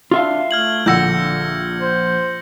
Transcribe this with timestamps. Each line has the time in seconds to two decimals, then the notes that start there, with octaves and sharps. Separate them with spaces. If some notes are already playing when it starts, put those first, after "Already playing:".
0.11 D4 F4 E5 F5
0.51 A3 F6 G#6 F#7
0.86 A#1 D3 F#5 E6 G6 A#6 C#7
1.80 C5